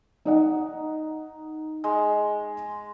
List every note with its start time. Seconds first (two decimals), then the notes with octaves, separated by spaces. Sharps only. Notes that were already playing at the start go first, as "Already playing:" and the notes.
0.25 D#4 D#5 F#5
1.84 G#3